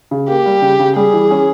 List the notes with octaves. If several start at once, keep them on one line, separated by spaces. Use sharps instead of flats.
C#3
A#3 G4
G3
C#3
C#3
G3 G#4
E3
C#4